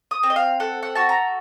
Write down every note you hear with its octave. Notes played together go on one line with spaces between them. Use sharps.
D#6
C4
D#5
F5
A4 F#5
F#5
F#4 A5
A#5